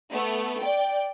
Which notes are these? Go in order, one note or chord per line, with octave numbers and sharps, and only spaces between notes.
A3 B3
D5 G5